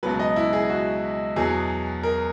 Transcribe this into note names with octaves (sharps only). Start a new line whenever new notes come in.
C#2 B2 F#3 B4
D#5
E4
G#4
F#4
E2 B2 F#3 G#4
A#4